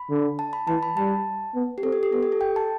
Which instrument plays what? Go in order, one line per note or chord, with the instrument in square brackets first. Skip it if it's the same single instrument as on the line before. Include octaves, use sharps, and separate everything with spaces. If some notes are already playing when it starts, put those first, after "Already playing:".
Already playing: [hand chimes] B5
[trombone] D3
[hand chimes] A5
B5
[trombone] E3 [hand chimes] A5
[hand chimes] B5
[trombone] G3 [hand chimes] A5
[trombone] B3
[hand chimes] G4
[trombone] C4 [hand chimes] A4
[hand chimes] G4
G4
[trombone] B3 [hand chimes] A4
[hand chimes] G4
A4
G5
A5